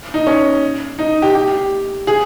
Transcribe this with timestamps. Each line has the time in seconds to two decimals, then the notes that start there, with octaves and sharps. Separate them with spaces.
0.14 D#4
0.27 C#4
0.99 D#4
1.22 G4
1.35 G4
2.07 G#4